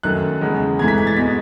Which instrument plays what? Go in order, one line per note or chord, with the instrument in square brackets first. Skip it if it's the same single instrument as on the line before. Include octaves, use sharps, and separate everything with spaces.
[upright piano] F#2 D#3 A3 F#6
E2 C#3 G#3
G#2 E3 A3 G#6
B6
G#6
A6
B2 G#3 B6